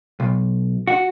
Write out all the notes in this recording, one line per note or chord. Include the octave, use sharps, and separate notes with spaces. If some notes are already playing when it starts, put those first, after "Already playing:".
B1
F#4